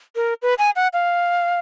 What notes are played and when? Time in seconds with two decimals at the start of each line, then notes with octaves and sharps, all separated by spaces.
0.16 A#4
0.42 B4
0.59 G#5
0.76 F#5
0.93 F5